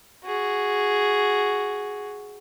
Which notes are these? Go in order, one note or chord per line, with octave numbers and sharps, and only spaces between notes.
F#4 G#4